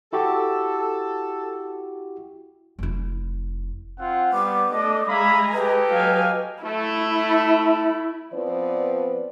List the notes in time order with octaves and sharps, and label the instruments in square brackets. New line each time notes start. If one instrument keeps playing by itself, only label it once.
[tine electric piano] E4 F#4 G4 [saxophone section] A4
[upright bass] F1 E4
[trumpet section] C4 F4 F#5
[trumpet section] G3 B3 [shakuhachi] D6
[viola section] A3 [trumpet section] D4 D#5
[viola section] G#3 G#5 A#5 [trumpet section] E5 F5 B5
[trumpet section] G4 A4 D#5 [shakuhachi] B4
[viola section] F#3 F5 G#5
[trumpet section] A3 [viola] E4
[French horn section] F3 B3 C4 B4 D5